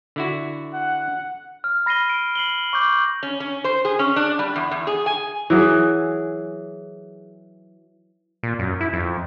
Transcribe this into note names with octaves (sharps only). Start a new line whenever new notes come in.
D3 E4 F#4
F#5
F6
B5 A#6 C7 D#7 G7
D7
C7 F#7 G7
C#6 D6 G6
C#4
C#4
C5
G#4
C#4
D4
G3
E2
E2
G#4
G#5
E3 F#3 G#4
A#2
F#2
E4
F2